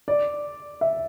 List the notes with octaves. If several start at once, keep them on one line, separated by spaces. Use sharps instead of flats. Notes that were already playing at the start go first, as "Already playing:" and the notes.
D5
E5